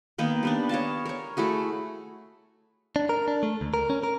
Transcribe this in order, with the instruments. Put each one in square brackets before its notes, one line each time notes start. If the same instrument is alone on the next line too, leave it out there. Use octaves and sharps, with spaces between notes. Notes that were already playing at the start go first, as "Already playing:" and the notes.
[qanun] D#3 A#3 B3 D#4
G3 B3 D4
C#5 D#5 F5 A5
A#4 C#5
A3 E4 F#4 G#4
[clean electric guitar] D4
A#4
D4
A3
D2
A#4
C#4
A#4